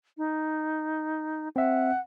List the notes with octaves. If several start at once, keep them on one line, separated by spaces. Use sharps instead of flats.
D#4
C4 E5 F#5